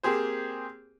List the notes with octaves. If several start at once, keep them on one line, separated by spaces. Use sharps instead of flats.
A#3 C4 G4 G#4 C5